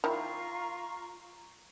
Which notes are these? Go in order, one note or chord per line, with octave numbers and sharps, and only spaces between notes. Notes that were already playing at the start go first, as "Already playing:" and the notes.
D#3 E4 F4 A#5 C#6